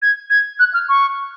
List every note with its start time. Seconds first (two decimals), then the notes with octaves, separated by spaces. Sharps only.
0.02 G#6
0.30 G#6
0.59 F#6
0.74 F6
0.89 C#6